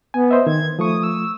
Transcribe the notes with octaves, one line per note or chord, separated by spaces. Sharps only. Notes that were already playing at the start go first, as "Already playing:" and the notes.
B3 G#5
C5 D#5 E5
D#3 G#6
F3 A3 C#6 D#6
E6